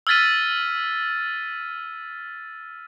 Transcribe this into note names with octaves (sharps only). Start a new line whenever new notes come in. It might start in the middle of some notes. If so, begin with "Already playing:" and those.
E6 F6 G#6 A6 B6 D#7